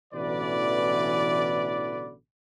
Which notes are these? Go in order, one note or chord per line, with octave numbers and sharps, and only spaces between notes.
A1 B2 D3 E3 B4 D5